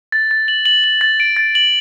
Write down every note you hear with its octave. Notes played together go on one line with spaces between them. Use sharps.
A6
A6
F#7
F#7
F#7
A6
D7
A6
F#7